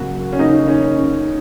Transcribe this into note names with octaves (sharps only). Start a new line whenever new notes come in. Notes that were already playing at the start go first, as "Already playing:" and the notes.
Already playing: C#3 F#3 A#3 F#4
C#4
C#3 A#3 D#4
C#4